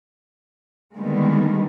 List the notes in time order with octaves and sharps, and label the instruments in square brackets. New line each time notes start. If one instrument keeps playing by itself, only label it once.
[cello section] D3 D#3 G3 G#3 A#3 B3